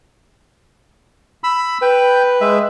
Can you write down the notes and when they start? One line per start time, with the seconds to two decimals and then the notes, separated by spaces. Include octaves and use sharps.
1.44 B5 E6
1.82 B4 G5
2.41 G#3 E5